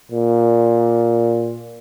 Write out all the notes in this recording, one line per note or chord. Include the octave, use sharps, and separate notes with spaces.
A#2